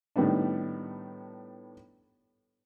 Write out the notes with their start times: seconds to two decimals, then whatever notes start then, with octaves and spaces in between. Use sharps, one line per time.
0.16 A2 D#3 G3 B3 D4